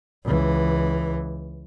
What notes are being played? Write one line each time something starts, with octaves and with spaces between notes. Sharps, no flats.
C#2 E3